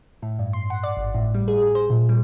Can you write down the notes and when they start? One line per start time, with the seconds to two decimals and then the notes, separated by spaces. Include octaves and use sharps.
0.22 A2
0.39 G2
0.53 C6
0.70 F#5
0.83 D5
0.97 G#1
1.15 A2
1.34 G3
1.48 G#4
1.75 C5
1.90 A#2
2.09 G3